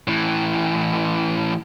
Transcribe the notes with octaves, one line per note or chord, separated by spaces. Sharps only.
A2 E3